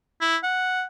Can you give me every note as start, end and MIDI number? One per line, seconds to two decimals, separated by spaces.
0.21 0.37 64
0.43 0.84 78